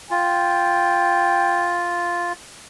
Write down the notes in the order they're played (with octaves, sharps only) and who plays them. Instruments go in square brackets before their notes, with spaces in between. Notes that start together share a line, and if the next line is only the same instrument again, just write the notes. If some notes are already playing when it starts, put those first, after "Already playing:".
[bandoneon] F4 [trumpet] G5